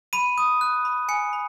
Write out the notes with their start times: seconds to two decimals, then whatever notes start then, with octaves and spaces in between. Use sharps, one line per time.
0.13 B5 D#7
0.38 D#6
0.61 F#6
0.85 B5
1.09 G#5 C#7
1.33 B5